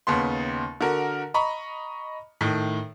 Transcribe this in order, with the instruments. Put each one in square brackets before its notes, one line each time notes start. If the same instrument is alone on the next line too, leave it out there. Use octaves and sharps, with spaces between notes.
[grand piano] D#2 C#3 B3 C6
D3 F#4 A#4
D#5 A#5 B5 C#6
A2 D#3